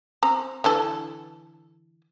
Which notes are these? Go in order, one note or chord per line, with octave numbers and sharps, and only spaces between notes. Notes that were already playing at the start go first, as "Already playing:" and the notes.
C4 A#5
D3 E3 A4